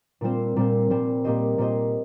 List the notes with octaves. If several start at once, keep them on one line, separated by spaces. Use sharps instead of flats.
A#2 G3 C4 F4 C5
A#2 G3 C4 F4 C5
A#2 G3 C4 F4 C5
A#2 A#3 G4 C5 D#5
A#2 A#3 G4 C5 D#5